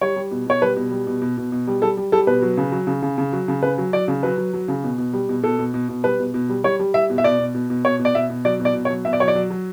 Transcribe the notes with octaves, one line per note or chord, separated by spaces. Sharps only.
G3 C#5
G3
B2
B2 C#5
G3 B4
B2
G3
B2
B2
B2
B2
G3
G3 A4
G3
G3 A4
B2 B4
F#3
C#3
F#3
C#3
C#3
C#3
F#3
C#3
C#3 B4
F#3
F#3 D5
C#3
F#3 B4
F#3
F#3
C#3
B2
B2
G3
B2
B2 A4
B2
B2
B2
G3 B4
B2
B2
G3
G3 C#5
G3
G3 E5
B2
E5
B2 D5
B2
B2
B2
B2 C#5
B2
D5
B2 E5
B2
F#3 D5
B2
D5
B2
C#5
F#3
B2 E5
D5
F#3 C#5
D5
F#3
F#3